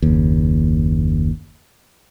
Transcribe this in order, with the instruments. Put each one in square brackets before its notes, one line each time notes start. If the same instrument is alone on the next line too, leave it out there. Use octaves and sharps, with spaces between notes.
[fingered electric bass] F#1 D#2